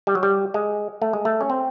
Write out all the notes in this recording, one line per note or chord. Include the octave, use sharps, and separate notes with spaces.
G3
F#3
G3
G#3
A3
G#3
A3
C#4
C4